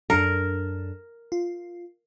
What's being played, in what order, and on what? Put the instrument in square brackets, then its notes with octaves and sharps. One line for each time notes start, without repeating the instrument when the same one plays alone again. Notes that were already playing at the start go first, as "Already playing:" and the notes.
[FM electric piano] F#2 D4 A4 [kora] A#4
[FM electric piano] F4